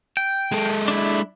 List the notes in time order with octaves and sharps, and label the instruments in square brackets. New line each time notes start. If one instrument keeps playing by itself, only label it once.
[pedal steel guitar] G5
[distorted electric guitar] G#3 A4
[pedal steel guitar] D4 E4